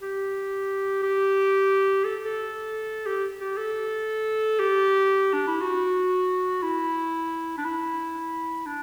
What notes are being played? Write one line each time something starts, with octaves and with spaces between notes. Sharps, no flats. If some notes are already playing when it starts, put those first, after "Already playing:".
G4
G4
A4
A4
G4
G4
A4
G4
D4
E4
F#4
E4
D4
E4
D4